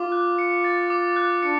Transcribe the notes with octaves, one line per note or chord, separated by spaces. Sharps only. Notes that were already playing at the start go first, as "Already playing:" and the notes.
Already playing: F4 D6
F#6
C#7
A6
D6
F#6
D4 C#7